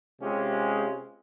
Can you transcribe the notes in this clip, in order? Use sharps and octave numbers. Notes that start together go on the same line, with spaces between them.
C3 G#3 C#4 F4 G4